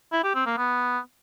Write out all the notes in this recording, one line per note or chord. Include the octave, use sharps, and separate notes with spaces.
E4
G4
C4
A#3
B3